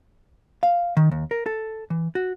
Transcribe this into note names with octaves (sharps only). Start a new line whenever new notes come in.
F5
D#3
D#2
A#4
A4
E3
F#4